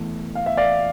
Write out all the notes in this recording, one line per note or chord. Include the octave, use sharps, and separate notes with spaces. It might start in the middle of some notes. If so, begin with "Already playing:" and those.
Already playing: E2 E3 A3
F5
E5
D5 F5